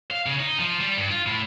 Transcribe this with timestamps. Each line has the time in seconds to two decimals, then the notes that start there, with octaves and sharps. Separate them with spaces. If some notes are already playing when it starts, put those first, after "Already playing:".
0.11 F5
0.26 C#3
0.39 D#4
0.59 F3
0.80 G3
0.97 G2
1.10 F4
1.26 A2